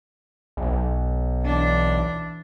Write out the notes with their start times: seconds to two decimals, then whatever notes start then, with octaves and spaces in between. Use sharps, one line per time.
0.57 B1
1.44 E3 D4